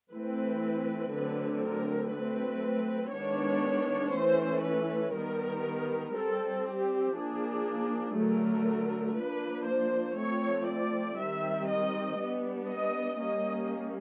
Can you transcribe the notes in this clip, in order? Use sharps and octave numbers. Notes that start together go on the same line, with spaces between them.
E3 A3 C4 B4
D3 F#3 A3 C4 B4
A#4
F#3 A3 C4 B4
D#3 G#3 B3 D4 C#5
E3 A3 C#4 C5
B4
D#3 G3 B3 A#4
G3 C4 A4
G4
F3 A#3 D4 G#4
D3 F#3 A3 A#4
F3 A#3 D4 B4
C5
F3 A3 C4 C#5
D5
D#3 G3 C4 E5
D#5
G3 B3 D4
D#5
G3 A#3 C#4 D#5